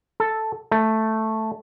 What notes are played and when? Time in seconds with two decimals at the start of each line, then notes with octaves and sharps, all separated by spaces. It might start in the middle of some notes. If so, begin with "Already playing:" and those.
0.20 A4
0.72 A3